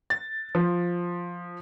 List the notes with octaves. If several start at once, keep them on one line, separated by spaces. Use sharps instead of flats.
A6
F3